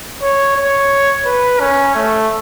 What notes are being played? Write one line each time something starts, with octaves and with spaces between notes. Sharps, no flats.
C#5
C#5
B4
C#4
A3